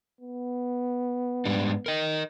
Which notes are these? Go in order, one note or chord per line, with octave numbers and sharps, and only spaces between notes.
B3
G#2 G3 D4
A#4 D#5